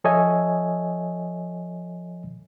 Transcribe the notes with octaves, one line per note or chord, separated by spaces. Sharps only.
F3 A4 C#5 D#5 E5 G#5